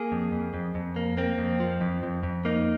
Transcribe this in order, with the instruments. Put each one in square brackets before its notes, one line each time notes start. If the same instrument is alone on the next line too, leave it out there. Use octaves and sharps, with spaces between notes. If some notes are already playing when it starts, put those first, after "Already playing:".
Already playing: [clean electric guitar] A#3 G#4
F2
F2
F2
F2
A#3
A#3 C4
F2
F3
F2
F2
F2
A#3 D#4